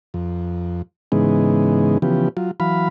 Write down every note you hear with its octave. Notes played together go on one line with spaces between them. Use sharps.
F2
G#2 C#3 E3 G#3 B3 D#4
C#3 E3 F3 B3 G4
F#3 F4
E3 F#3 F5 B5